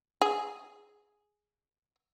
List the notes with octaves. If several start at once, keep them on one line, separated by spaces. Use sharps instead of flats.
G#4